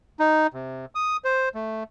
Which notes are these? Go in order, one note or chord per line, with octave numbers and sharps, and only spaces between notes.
D#4
C3
D#6
C5
A3